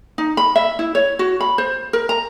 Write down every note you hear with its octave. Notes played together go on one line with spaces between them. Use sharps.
D#4
B5
E5
E4
C#5
F#4
B5
C5
A#4
A#5